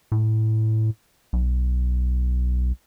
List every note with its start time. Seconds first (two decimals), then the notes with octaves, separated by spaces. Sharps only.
0.12 A2
1.33 B1